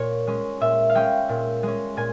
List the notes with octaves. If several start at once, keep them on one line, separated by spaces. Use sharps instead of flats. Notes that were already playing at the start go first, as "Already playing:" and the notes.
Already playing: A#2 C#5
G#3 C#4
A#2 E5
F5
G#3 C#4 G5
A#2
G#3 C#4
A#2 G#5